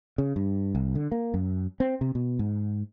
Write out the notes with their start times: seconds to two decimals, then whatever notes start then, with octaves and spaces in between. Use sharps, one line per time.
0.18 C#3
0.36 G2
0.75 C2
0.95 D3
1.12 A#3
1.34 F#2
1.80 C4
2.01 C3
2.15 B2
2.39 G#2